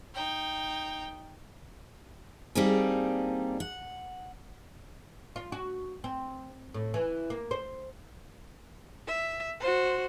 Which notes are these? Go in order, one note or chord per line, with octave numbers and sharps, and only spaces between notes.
D#4 G5
G3 A#3 C4 D4 D#4 G#4
F#5
F4
F#4
C4
A2
E3
A#3
C5
E5
F#4 C5